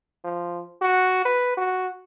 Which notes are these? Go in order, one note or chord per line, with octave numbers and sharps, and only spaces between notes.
F3
F#4
B4
F#4